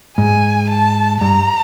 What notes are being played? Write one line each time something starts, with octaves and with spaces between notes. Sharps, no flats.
G#2 G#5
A5
G2 A#5